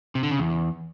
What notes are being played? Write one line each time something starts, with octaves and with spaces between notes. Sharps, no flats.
C3
D3
C#3
E2